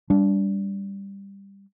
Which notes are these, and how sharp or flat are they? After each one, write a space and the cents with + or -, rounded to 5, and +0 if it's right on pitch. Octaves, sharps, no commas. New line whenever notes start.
G3 +15 D4 -25